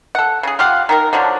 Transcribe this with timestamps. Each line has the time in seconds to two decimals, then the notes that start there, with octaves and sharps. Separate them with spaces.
0.15 A4 F#5
0.43 C#3 G#4
0.59 F4 G4 F5 F#5
0.89 D#3 D#4 A#4
1.13 D3 F3 F#3 D4